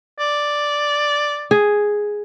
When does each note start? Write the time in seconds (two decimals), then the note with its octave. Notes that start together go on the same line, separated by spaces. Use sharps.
0.19 D5
1.51 G#4